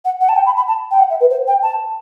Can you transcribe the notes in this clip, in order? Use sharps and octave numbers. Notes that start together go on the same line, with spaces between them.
F#5
F#5
A5
G5
B5
B5
A5
G5
F#5
E5
B4
C5
G5
A5